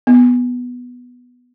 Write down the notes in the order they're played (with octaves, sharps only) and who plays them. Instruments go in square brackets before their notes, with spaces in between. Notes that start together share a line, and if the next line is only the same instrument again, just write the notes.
[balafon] B3